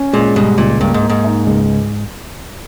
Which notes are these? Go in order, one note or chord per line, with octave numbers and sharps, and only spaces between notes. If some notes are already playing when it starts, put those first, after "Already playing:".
Already playing: C#4
A#2 G#3
G#2 B2 G3
C#2 A#2
G2 A#3
G#2
A#3
G#2
D#4
C#2